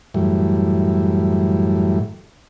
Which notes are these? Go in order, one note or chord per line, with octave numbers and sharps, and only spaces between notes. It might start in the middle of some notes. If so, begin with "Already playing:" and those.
F#2 A2 E3 G3